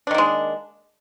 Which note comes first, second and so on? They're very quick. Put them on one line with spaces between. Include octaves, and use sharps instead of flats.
D4 D#3 A#3 G#3